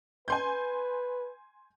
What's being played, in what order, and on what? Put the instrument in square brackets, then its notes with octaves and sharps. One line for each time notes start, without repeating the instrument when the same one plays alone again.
[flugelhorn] B4 [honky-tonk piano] G#5 C6 G6